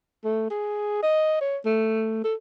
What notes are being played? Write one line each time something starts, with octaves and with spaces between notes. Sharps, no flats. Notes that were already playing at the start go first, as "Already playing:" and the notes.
A3
G#4
D#5
C#5
A3
A4